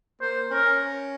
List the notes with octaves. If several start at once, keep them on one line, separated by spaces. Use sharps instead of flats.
A#3 C5
C#4 A#4